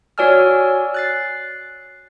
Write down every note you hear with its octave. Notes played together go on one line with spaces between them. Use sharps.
F#4 C#5 D5 G#5 E6 F6
F#6 A6 C7